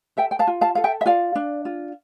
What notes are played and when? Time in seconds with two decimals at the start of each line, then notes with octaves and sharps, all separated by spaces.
0.17 A4 E5 G5
0.31 G5
0.39 F5 A5
0.47 F4
0.61 F5 A5
0.75 A4 F5
0.84 E5 G5
1.01 E5
1.06 F4 D5 F5
1.35 D4
1.65 F4